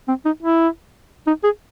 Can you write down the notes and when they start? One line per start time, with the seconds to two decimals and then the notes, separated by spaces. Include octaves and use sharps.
0.08 C4
0.25 D#4
0.43 E4
1.27 D#4
1.44 G#4